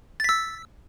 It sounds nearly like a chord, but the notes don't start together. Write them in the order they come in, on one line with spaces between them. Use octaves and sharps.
A6 B6 E6